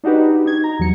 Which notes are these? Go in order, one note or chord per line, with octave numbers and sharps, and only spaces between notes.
D4 D#4 F#4 G4 B4
D#4 G#6
A#5
E2 F#3 C#7